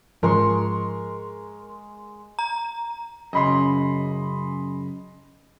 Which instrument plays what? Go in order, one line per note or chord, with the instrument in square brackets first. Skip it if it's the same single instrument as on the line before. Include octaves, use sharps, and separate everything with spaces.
[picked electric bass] G#2 F3 [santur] G#3 C6 C#6 [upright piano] A#4
[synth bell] A#5
[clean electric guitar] F#2 C#3 [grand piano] D#5 B5 C6